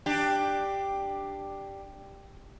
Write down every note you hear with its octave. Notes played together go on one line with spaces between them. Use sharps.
D4 G4